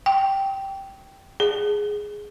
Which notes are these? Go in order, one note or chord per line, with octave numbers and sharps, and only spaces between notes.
G5
G#4